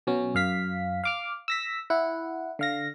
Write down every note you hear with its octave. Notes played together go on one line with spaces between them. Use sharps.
B2 F#3 C#4
F#2 F5 B6
F5 D6 F6
E6 A#6 B6
E4 F#5
D3 F5 A#6